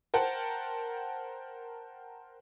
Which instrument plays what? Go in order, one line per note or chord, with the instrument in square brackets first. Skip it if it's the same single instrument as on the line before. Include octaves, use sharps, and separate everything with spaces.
[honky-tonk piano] A#4 C5 F#5 G5 A5